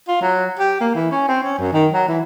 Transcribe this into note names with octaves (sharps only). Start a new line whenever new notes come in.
F4
F#3
G4
A#3
E3
C#4
C4
C#4
F#2
D#3
F#3
E3